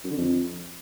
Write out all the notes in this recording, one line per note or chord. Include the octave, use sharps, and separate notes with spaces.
F#2
D3
F2